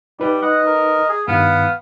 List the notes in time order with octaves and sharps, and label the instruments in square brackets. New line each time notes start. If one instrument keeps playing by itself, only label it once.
[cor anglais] G3 [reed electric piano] D#4 B4
[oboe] D#5 [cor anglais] F#5
[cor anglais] A#4
[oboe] G#4
[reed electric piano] G2 D#3 [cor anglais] B3 [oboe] F5